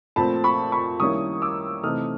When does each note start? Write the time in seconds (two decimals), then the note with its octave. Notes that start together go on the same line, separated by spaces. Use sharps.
0.16 A#2 F3 A3 C4 A5 B5
0.44 B5 C#6
0.72 B5 C#6
1.00 D#3 G3 A#3 C#4 E4 C#6 D#6
1.42 D6 E6
1.83 C3 E3 A3 C4 D#4 D#6 F6